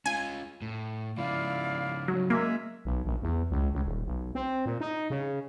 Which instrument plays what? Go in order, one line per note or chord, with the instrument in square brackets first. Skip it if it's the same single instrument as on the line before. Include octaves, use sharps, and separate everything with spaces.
[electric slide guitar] C#4 F4 [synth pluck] G#5
[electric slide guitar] A2
[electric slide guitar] C#3 F3 [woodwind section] E4 D5 F5
[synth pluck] F#3
[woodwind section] G#3 C#4 E5 [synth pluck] A#3
[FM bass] B1
A#1
E2
C#2
C#2
D#1
B1
C4
A#2
D#4
C#3